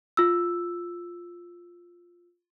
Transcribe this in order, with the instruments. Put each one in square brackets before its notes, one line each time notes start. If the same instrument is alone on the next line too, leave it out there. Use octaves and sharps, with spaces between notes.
[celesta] F4 E6